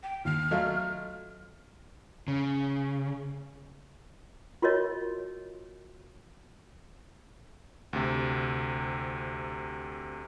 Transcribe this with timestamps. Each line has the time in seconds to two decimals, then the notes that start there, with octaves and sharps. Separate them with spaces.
0.03 G5
0.25 D#2 F6
0.51 F#3 A3 F4 D#5
2.28 C#3
4.62 F4 F#4 A#4 C#5 D#5
7.93 D2 C3